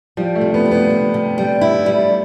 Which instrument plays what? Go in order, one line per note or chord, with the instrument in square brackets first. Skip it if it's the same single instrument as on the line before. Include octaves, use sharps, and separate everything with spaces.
[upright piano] F3 [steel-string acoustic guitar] G3
[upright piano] A3
[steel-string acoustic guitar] C3
[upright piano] B3
[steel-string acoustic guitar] G3
[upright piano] B3
[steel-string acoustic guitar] C3
C3
G3
E4
G3